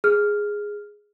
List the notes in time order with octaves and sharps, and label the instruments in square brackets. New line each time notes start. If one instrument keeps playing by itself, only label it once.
[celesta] G#4 F6